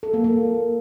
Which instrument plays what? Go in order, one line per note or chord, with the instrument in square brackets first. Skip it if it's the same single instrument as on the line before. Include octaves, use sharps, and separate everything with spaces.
[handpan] A4
A#3
A#3